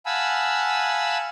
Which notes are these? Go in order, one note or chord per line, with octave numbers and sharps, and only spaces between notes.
F5 F#5 G#5 A5 B5 E6